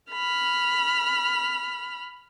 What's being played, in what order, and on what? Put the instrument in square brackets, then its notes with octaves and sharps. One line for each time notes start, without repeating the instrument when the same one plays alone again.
[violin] B5 F6